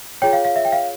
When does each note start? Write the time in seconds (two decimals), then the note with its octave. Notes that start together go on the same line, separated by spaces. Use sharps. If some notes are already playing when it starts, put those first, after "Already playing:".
0.22 F4 G#4 C#5 G5
0.33 F5
0.45 F5
0.56 E5
0.65 G5
0.72 F5